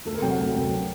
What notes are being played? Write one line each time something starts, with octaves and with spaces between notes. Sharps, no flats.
D2 A4
A#4
C3 F#3 G5
F#5
D2
C3 F#3